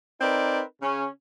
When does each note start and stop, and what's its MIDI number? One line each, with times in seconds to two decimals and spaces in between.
0.21 0.63 60
0.21 0.63 63
0.21 0.63 70
0.21 0.63 71
0.21 0.63 74
0.82 1.06 49
0.82 1.06 61